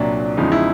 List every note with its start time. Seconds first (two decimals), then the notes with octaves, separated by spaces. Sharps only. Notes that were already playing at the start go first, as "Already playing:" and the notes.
Already playing: C2 A#2 F#3 D4
0.37 E2 C#3 F3 G#3 D#4
0.52 E4